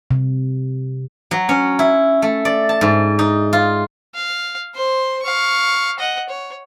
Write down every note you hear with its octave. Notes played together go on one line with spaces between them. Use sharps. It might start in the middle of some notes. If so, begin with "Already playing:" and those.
C3
F#3
C#4
E4
A3
D5
A5
G#2
D#4
F4
F5
C5 C6
F5 C#6
D#5 F#5
C#5